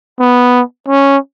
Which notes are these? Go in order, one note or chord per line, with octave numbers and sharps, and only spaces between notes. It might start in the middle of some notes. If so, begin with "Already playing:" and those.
B3
C#4